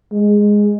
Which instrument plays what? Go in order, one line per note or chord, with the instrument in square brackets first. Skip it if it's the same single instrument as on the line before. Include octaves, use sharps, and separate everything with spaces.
[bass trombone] G#3